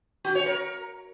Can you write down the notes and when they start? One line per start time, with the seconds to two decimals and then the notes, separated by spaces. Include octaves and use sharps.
0.25 F#4
0.35 C#5
0.46 A#4